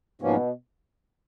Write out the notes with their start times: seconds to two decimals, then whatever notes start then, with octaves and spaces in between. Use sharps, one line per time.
0.22 G#2 B2 F3 A#3 C#4